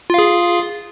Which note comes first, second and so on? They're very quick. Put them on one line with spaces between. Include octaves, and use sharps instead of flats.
F4 F5 G#4